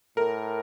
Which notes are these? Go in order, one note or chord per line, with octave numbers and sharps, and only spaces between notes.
A2 A#4